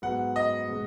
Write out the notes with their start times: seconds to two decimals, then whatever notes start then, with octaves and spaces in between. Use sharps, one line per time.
0.02 G#2 F#3 B3 F#5
0.36 D#5
0.69 B2 G#3